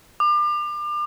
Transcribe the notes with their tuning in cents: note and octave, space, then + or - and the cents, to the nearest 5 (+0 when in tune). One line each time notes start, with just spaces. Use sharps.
D6 +35